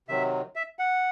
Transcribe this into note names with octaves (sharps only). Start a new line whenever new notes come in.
C3 D#3 F#3 E5
E5
F#5